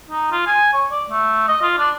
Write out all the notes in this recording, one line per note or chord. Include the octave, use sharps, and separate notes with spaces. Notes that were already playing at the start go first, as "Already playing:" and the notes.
D#4
F4
G#5
C#5
D5
A3
D#5
F4
D4